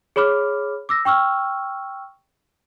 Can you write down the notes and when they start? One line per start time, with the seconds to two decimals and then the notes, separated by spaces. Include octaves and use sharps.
0.16 G#4 C#5 B5 D6 F6
0.89 D6 E6 A#6
1.05 G5 C#6 E6 F6